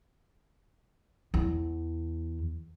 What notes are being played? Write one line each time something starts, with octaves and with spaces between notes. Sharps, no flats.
E2